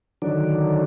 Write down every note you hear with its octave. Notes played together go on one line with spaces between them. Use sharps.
D3 D#3 F#3 D4